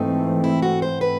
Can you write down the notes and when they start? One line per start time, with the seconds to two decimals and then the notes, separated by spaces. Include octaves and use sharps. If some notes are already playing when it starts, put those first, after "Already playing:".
Already playing: G#2 E3 A3 C4 D#4
0.44 E4
0.62 F#4
0.82 C5
1.01 B4